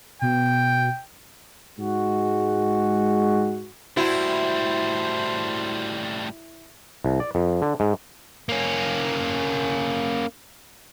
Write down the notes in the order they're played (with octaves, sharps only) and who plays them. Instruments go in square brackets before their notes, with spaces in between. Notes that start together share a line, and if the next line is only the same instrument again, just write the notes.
[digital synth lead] B2 [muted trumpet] G5
[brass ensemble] G#2 G#3 F#4
[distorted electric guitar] A2 G3 [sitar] E4 [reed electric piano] F#4 [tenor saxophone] C5
[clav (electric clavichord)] C2
D5
F2
D3
G#2
[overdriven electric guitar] A#3 C#4